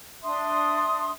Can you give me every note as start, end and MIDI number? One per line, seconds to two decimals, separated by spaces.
0.24 1.11 62
0.24 1.11 76
0.24 1.11 84
0.24 1.11 87